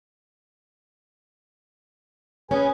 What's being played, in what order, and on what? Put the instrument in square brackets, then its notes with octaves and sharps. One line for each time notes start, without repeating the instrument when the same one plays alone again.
[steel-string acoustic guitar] C#4 [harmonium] G#4 B4 G#5